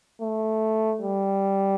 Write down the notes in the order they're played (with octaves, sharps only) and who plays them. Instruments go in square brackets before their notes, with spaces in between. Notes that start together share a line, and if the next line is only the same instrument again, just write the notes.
[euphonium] A3
G3